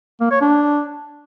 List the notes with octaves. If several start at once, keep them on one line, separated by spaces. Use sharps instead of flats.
A#3
C#5
D4